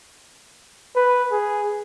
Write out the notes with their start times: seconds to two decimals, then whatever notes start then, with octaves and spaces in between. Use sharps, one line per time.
0.95 B4
1.32 G#4